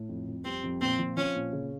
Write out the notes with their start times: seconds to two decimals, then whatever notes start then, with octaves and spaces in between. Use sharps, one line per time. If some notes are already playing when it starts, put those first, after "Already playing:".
Already playing: A2
0.09 F2
0.27 F2
0.45 G3 C4
0.63 F2
0.81 A#2 C4
0.99 F3
1.17 F3 C#4
1.35 A#2
1.53 C#3